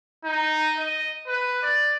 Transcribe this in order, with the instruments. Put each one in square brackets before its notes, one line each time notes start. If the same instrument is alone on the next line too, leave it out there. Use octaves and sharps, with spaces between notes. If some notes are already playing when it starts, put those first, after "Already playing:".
[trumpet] D#4
D#5
B4
D5